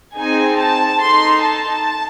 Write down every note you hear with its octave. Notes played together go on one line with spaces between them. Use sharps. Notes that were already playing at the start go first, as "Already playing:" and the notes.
C4 D#4 G#4 G#5
A5
D#4 A4 C6
A5